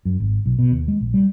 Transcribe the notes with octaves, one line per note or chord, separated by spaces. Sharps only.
F#2
G#1
B1
B2
D#2
G#3
A#1
G3